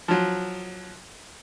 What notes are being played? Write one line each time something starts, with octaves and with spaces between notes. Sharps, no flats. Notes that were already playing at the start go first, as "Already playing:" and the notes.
F3 F#3